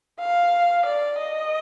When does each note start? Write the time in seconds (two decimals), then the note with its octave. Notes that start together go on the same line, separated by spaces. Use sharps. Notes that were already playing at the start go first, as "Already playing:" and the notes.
0.20 F5
0.86 D5
1.19 D#5